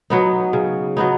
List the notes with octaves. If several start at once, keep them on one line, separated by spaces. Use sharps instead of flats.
F#3 B3 D#4
C#3
F#3 B3 D#4